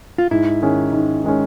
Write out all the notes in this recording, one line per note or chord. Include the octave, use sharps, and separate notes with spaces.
F4
G#2 E4
D#3 G#3 C#4
G#2
D#3 G#3 C#4